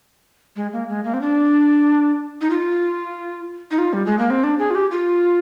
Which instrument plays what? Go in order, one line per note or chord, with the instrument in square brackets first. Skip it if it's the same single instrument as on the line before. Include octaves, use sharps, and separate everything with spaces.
[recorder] G#3
A#3
G#3
A#3
C4
D4
D#4
F4
D#4
F4
G3
G#3
A#3
C4
D4
G#4
F4
G4
F4